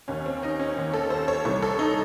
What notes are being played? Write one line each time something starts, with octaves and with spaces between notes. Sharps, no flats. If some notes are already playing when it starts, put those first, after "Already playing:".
D#2 D#3 C#4
C4
D#4
C#4
D#2 D#3
A4
C5
C#5
C2 C3 E3 C#5
A4
D#4